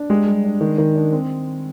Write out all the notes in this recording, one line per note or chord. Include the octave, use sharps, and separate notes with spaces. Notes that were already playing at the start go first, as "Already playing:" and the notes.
Already playing: D4
G#3 G4
G3
D4
D#3
D#3
D4
C4